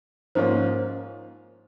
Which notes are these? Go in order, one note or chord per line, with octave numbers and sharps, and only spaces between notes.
G#2 F3 A#3 C#4 F4 C5